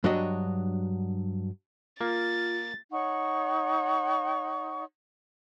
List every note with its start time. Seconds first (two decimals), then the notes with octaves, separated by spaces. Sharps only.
0.04 G2 F#3 D4 F#4 C#5 D#5
2.01 A#3 F4 A6
2.92 D#4 C#5 F#5 C#6